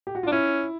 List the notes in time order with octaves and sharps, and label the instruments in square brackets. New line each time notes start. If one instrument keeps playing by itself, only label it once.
[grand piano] G4
F#4
F4
[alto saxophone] D4
[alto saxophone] C#4 [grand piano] E4